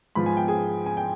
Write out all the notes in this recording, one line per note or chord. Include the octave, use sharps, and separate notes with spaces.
G#2 F3 B3 F4 B5
G#5
G5
G#4 G#5
G#5
G5